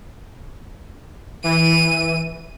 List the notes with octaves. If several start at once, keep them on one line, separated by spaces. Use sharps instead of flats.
E3 D#7